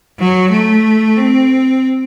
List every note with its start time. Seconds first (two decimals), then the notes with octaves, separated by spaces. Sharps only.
0.19 F#3
0.52 A3
1.17 C4